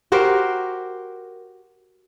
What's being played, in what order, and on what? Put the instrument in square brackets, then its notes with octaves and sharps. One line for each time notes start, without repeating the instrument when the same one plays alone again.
[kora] F#4 G4 A#4 C5